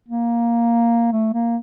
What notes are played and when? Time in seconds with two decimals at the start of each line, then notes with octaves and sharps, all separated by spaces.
0.08 A#3
1.12 A3
1.33 A#3